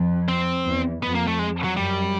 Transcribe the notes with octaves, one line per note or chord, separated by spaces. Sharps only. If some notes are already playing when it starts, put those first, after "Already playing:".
Already playing: F2
C4
E2
F2 B3
A#3
A3
G#3
F#3
F#2 G3